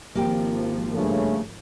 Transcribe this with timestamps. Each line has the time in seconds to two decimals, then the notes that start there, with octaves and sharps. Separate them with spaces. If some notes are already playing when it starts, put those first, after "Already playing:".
0.15 G#1 F3 A#3 G4 G5
0.94 G2 C#3 A3